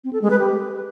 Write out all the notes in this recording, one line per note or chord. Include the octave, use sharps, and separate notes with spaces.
C4
A4
G#3
B4
G4